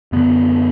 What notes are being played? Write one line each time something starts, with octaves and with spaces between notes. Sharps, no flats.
F#2 D3 B3